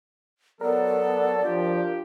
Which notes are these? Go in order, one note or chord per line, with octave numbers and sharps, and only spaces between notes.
F#3 B3 A4 A#4 D5
F3 D4 F4 G4